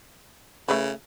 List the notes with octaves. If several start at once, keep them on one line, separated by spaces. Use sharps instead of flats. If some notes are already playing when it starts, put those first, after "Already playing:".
C#3 A3 B4